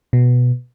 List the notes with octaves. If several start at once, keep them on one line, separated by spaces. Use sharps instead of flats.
B2